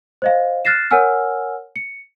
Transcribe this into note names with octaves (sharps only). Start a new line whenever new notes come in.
C5 D#5 F5
F6 F#6 A6 A#6 C7 E7
A#4 C#5 F#5 G#5 E6 F6
C#7